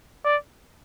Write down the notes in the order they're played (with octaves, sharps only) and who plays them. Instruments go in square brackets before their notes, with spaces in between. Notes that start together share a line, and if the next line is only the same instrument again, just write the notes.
[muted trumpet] D5